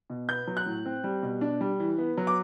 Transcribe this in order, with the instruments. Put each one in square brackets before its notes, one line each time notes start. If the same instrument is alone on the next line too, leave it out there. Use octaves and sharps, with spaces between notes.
[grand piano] B2
B3 G6
F#3
F#6
A2
C4
G3
B2
D4
G3
E3
B3
F#3
D6